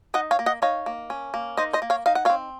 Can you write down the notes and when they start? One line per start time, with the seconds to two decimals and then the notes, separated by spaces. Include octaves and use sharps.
0.14 D#4 D#5 F#5
0.31 C#5 F5
0.39 A#3
0.46 D#5 F#5
0.62 D#4 C#5 F5
0.86 A#3
1.10 C#4
1.34 A#3
1.57 D#4 C5 D#5
1.73 C5 D#5
1.82 A#3
1.90 C#5 F5
2.06 D#4 F5
2.15 F#5
2.25 C#5 F5
2.30 C4